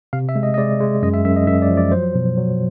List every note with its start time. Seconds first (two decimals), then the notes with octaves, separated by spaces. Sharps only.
0.13 C3 F5
0.29 E5
0.36 G#3
0.43 D#5
0.54 D#5
0.58 G#3 D5
0.80 G#3
1.02 F#2 D#5
1.14 E5
1.25 F#2 E5
1.36 D#5
1.47 F#2 E5
1.62 D5
1.70 F3
1.77 D5
1.92 F#3 C5
2.15 B2
2.37 F#3